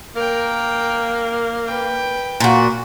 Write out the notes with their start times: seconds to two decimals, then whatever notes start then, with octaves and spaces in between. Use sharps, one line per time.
0.16 A#3 A#4 G5
1.67 B4 G5
2.40 A#2 F#4